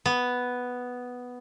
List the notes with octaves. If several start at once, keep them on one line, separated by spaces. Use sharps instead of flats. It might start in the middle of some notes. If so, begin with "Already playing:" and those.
B3